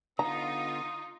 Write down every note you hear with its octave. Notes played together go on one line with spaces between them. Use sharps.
D3 B3 D#4 F4 D#5 A#5 D#6